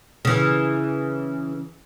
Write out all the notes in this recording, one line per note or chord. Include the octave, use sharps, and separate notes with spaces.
C#3 E3